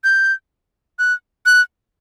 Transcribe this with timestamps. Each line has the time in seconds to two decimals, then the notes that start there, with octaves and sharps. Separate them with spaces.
0.04 G6
0.99 F#6
1.46 F#6